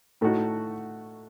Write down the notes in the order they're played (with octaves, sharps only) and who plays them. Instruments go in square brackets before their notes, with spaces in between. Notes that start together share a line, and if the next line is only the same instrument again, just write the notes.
[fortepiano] A2 A3 D#4 F#4